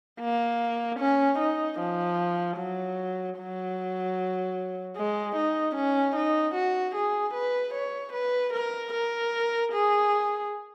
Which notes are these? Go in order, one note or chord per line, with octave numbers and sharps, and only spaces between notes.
A#3
C#4
D#4
F3
F#3
F#3
G#3
D#4
C#4
D#4
F#4
G#4
B4
C#5
B4
A#4
A#4
G#4